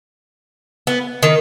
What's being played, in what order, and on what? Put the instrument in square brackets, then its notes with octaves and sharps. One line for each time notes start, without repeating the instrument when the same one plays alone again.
[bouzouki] B3
D#3